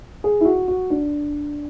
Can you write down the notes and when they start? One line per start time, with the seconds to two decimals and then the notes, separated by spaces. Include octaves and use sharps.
0.24 G#4
0.41 E4
0.45 F#4
0.68 F#4
0.90 D4